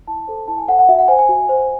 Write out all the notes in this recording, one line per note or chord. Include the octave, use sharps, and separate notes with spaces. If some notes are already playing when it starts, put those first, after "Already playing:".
E4 A5
A4 C5
E4 A5
G#5
A4 C5 F#5
F#5
F#4 E5
F#5
C5 G#5
G#5
F#4
C5